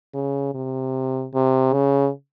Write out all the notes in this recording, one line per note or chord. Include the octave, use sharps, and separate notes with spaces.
C#3
C3
C3
C#3